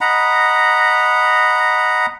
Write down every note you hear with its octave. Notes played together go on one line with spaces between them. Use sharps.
D#5 F#5 A#5 B5